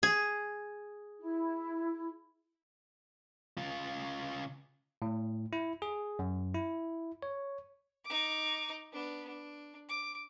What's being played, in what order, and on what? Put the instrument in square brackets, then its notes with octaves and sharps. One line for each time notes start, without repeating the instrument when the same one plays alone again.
[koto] G#4
[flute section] E4
[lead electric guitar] C#3 F4
[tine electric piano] A2
E4
G#4
F#2
E4
C#5
[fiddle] D#4 D6
B3 D4
D4
D6